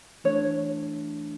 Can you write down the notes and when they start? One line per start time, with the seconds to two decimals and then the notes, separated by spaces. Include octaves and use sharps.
0.24 E3 A3 D4 C#5